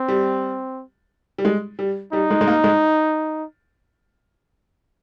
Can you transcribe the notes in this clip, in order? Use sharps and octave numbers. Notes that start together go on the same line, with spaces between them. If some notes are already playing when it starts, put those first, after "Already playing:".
Already playing: C4
G3
G3
G#3
G3
G3 D#4
G#3
G#3
A#3
G#3